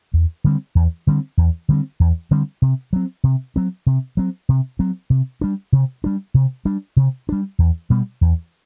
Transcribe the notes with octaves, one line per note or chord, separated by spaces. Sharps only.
E2
D3 G3 C4
E2
D3 G3 C4
E2
D3 G3 C4
E2
D3 G3 C4
C3
F#3 C4
C3
F#3 C4
C3
F#3 C4
C3
F#3 C4
C3
G3 D4
C3
G3 D4
C3
G3 D4
C3
G3 D4
E2
B2 G3 B3
E2